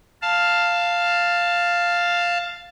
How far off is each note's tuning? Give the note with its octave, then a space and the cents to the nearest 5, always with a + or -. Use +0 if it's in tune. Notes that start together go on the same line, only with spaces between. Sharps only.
F5 +0 A5 +10